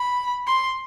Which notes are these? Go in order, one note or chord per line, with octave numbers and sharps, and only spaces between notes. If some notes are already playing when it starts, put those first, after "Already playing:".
Already playing: B5
C6